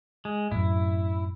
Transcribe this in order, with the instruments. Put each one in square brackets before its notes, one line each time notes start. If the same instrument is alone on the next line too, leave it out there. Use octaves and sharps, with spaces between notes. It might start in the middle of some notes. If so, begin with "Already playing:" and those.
[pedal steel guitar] G#3
[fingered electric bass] F#2 A2 [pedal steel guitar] E4